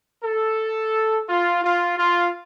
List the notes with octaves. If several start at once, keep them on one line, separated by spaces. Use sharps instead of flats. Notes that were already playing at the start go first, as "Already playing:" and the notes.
A4
F4
F4
F4